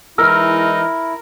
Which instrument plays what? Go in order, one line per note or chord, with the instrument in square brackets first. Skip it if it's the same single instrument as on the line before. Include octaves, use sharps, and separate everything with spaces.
[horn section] E3 G#3 D#4 [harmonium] E4 [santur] A#4 [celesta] E6 F6